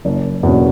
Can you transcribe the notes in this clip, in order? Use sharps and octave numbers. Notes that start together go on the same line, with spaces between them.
F#1
E2 B2 A#3 C#4